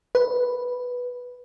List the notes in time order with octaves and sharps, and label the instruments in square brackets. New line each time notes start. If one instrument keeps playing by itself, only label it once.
[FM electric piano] B4